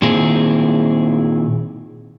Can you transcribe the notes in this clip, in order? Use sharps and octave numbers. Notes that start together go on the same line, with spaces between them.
A#2 D#3 C4 E4 G#4